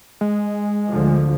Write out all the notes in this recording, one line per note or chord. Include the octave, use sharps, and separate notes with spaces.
G#3
D2 D3 F3